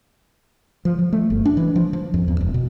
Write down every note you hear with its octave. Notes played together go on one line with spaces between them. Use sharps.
F3
F3
A3
G1
D4
E3
F3
F3
F2
E2
E1
B2